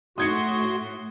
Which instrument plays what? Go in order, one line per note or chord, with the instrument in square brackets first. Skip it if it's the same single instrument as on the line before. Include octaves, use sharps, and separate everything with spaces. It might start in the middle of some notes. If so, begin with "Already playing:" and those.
[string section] A2 [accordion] F#4 C6 [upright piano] D#6 G#6 C#7